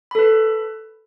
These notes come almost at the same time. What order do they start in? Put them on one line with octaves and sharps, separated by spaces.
B5 A4 B4